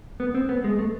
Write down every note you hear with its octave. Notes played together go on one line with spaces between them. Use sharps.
B3
C4
B3
G#3
A3